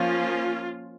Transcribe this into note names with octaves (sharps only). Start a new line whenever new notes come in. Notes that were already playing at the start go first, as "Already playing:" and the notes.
Already playing: F3 A#3 C#4 F4